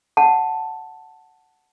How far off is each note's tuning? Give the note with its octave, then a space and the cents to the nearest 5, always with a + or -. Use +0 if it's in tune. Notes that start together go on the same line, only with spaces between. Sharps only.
F#5 +0 A5 +0